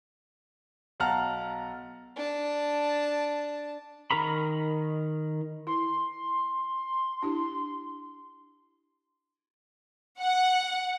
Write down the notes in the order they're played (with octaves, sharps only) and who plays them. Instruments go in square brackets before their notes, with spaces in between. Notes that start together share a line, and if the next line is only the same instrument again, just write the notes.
[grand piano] B1 F5 F#5 A5 A#5 F6
[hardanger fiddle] D4 A5
[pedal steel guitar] D#3 A#4 A#5 B5
[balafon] E4 [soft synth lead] C6
[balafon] D4 E4 G4
[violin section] F#5